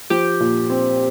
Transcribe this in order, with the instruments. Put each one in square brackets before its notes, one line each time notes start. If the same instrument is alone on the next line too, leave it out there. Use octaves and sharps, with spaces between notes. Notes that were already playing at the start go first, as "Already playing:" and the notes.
[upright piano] F3 [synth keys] G4
[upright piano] A#2
C4